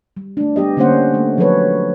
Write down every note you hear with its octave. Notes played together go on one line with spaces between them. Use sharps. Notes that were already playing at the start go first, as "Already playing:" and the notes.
G3
A3 D4
G3 B3 G4 D#5
D3 A#3 C#4 D4 C5 F#5
A3
F3 F#3 G#4 A4 B4 C#5